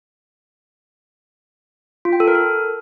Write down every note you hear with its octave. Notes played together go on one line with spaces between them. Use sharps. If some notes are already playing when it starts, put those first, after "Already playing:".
F4
G5
A4
A#4
A4